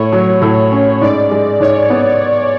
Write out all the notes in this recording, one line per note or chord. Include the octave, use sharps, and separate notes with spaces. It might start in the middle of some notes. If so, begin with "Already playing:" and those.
Already playing: A2 C#5
F#3
A2
C#4
G#2 D5
G#3
G#2 C#5
B3